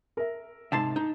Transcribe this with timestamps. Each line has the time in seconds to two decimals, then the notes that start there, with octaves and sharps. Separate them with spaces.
0.17 A#4 E5
0.72 G#2 C3 A5 C6
0.96 D#4